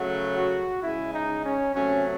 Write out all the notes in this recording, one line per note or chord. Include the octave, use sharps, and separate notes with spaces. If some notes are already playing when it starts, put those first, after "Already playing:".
Already playing: C#3 F#3 A3 F#4
F#4
C#3 G#3 E4
D#4
C#4
C3 F#3 A3 C#4